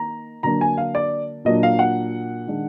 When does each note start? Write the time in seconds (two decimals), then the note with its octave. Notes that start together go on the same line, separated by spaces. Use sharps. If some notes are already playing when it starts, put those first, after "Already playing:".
Already playing: D#3 A#3 A#5
0.43 D3 F#3 A#3 D4 A#5
0.61 G#5
0.78 F5
0.95 D5
1.45 A#2 F#3 A#3 D4 D#5
1.63 F5
1.79 F#5
2.47 D#3 G#3 D4